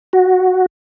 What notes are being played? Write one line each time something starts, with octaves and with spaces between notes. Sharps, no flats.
F#4